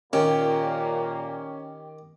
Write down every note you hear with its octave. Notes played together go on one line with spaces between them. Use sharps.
A#2 D#3 A#3 C#4 G4